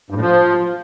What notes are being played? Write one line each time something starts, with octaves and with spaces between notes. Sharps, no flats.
G2
A2
F3